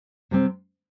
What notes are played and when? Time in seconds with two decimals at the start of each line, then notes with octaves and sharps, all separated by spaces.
0.31 C3 G3 C4